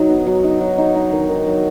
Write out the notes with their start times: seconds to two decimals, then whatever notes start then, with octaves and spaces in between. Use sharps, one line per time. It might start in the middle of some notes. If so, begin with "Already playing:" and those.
Already playing: F#3 D#4
0.09 B3
0.27 F#3
0.44 D#4
0.61 F#3
0.78 D#4
0.95 D#4
1.12 D#3
1.29 D#3
1.47 F#3